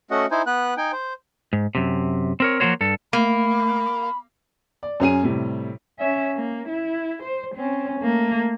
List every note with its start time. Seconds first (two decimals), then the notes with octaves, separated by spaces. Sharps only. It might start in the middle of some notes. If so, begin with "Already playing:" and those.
0.11 A3 C#4 F#4 D#5 F#5
0.31 D#4 E4 C5 G#5
0.47 B3 B4 F#6
0.77 D#4 G5 G#5
0.92 C5
1.53 G#2
1.75 F#2 C3
2.40 C4 A#4 C#5
2.60 F3 F#3 A#3 F#4 C5 C#5
2.81 G2 A4
3.13 A3 A#3 B5
4.83 D5
5.00 F#2 C#4 G#4 D#7
5.23 A2 C3 G3
5.99 C#4 E5
6.36 A#3
6.69 E4
7.23 C5
7.56 C4 C#4
8.00 A3 A#3